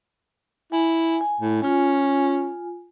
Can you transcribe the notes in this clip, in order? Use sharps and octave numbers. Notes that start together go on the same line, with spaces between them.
E4 G#5
G#5
A2
C#4 F4 G#5